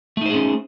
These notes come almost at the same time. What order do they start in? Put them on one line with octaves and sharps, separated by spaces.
A3 D#4 C5 G#4 C#4